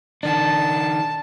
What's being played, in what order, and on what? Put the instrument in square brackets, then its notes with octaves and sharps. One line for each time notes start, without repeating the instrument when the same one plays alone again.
[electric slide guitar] D#3 D4 [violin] A5